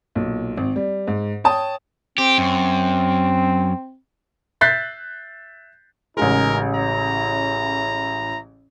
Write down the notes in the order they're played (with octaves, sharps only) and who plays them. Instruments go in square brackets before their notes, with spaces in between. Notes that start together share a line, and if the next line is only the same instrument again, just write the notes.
[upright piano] B1 A#2
G#1
G3
G#2
C#5 G5 A5 D#6
[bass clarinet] C4 [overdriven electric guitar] G4
[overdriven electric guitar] F#2
[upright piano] E5 F#6 G6 A6 B6 C7
[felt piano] A1 C#3 G#3 [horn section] D#4 G#4 A#4
[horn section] C#4 E4 A#5